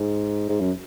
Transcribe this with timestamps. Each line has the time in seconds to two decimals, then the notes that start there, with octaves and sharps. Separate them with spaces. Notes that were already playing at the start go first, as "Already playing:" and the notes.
Already playing: G#2
0.49 G#2
0.60 F#2